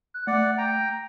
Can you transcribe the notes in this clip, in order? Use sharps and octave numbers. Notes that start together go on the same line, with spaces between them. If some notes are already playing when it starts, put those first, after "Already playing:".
F#6
A3 D5 F#5
G5 A#5